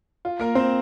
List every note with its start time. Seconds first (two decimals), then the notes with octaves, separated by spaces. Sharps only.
0.25 F4
0.40 A#3 A#4
0.55 C4 C5